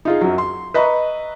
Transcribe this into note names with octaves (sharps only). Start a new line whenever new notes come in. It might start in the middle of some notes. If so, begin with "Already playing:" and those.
D#4 F4 G#4
F#2 F#3
C6
B4 D#5 E5 A#5 B5 C#6